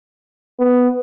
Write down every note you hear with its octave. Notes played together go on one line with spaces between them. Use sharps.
B3